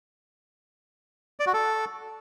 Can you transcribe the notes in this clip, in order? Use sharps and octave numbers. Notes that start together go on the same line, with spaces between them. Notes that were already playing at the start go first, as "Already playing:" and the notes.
D5
F#4
A4